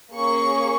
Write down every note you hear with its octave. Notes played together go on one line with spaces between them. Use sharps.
A#3 C#4 G#4 C#6